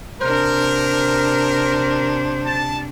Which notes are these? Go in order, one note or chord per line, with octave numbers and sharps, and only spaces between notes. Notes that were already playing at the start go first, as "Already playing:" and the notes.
C3 D4 A#4 C5
A5